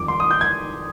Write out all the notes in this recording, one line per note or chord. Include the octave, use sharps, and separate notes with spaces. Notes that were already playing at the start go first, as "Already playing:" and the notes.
Already playing: F2 D#3 G3 D6
C6
D#6
G6
G#6